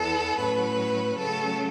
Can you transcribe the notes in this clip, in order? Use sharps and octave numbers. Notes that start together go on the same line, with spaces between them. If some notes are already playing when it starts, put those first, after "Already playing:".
Already playing: E2 E3 B3 A4
A2 F#3 C#4 B4
C#3 F#3 A3 C#4 A4